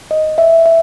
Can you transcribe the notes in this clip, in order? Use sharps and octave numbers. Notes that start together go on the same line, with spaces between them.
D#5
E5
E5